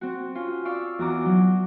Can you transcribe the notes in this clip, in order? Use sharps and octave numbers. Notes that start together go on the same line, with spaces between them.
C4 F#4
C#4 F4
D5 F5 C#6 E6
E2 F#4 A#5 D6
F#3